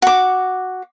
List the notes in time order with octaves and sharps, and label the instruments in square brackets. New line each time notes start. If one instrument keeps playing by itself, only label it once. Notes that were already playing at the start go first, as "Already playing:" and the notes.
[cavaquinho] F#4 D6